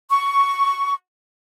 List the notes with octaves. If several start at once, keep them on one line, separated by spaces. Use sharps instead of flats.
C#6